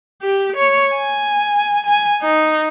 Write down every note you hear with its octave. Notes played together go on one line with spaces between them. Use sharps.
G4
C#5
G#5
G#5
D#4